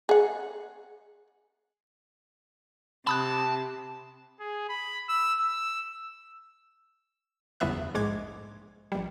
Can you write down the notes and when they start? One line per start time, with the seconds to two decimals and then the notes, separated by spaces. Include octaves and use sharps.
0.09 G#4 F#5
3.07 C3 A5 B5 D#6 F#6
4.40 G#4
4.69 B5
5.09 E6
5.40 E6
7.60 G1 E2 C#3 B3 E5 F#6
7.94 A#1 G#2 G#3 D6 G#6
8.92 A#1 G3